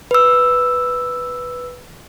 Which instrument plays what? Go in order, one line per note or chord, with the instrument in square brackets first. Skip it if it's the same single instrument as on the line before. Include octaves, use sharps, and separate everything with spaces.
[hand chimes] B4 E6